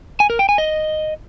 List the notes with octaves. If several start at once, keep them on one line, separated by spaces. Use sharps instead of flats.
G#5
A#4
G5
G#5
D#5